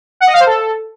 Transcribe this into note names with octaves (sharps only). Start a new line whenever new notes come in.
F#5
D#5
F5
C5
A4